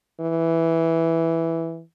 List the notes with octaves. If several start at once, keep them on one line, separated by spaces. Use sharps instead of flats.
E3